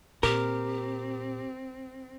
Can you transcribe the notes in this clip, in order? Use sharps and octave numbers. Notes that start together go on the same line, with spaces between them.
A#2 C4 G4 A#4